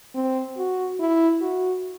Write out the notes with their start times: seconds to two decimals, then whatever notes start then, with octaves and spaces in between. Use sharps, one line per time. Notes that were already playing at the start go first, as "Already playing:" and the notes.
0.15 C4
0.58 F#4
1.00 E4
1.41 F#4